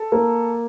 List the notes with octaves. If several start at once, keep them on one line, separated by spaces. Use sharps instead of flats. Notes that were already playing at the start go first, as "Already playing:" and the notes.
Already playing: A4
A#3